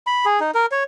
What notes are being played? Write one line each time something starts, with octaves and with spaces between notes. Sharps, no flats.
B5
G#4
D#4
A#4
C#5